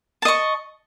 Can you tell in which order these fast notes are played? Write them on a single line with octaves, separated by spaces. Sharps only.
A5 D#5 C#6